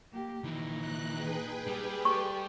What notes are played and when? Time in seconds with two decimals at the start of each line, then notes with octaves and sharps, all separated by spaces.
0.12 A#3 G4
0.44 A#2 D#3 E3 D#4
0.78 F#6
1.14 G#4 B4 G5
1.67 G3
2.05 G4 A4 C#6